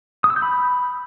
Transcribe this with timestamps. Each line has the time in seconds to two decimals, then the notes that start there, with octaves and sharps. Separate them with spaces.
0.24 D#6
0.30 E6
0.36 G6
0.42 B5